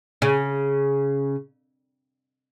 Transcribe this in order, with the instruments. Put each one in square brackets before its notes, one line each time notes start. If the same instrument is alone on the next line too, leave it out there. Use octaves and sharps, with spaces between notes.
[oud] C#3